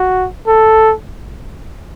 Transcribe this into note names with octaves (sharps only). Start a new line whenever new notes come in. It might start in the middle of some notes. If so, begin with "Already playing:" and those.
Already playing: F#4
A4